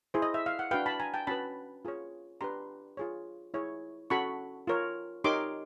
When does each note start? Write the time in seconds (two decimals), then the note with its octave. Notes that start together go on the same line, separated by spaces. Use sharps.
0.14 E4 G#4 C5
0.22 D#5
0.34 E5
0.46 F5
0.59 F#5
0.71 D4 F#4 B4 F5 G5
0.86 A5 B5
1.00 G#5 A#5
1.14 G5 A5
1.27 C#4 F#4 B4 A5 B5
1.85 F4 G#4 C#5
2.41 D4 G4 B4 A#5 C6
2.97 F4 G#4 C#5
3.54 E4 G#4 C#5
4.10 C#4 F#4 A4 B5 C#6
4.67 F4 A#4 C#5
5.24 D#4 G4 A#4 C#5 C6 D6